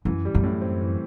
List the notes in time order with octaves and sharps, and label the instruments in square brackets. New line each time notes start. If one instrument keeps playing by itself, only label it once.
[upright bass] F#2 [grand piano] E3
[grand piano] G3
[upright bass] F#2
[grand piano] A2
C4
E3